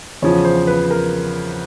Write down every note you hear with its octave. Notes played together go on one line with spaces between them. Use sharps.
E2 C#3 F3 C#5
C5
B4
A#4